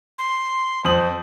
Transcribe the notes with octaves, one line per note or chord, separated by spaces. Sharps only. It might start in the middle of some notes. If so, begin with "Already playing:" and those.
C6
F2 C5 D#6 F#7